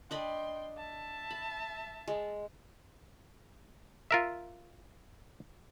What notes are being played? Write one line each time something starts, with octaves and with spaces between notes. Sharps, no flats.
D4 D#5 G5 B5 C6
E5 A5
B5
G#3
F4 A#4 E5